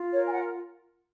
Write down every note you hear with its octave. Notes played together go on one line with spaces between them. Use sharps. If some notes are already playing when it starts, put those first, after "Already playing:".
Already playing: F4
A#4 C#5
G#5
F#5